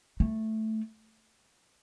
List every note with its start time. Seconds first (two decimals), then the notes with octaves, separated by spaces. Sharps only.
0.20 A3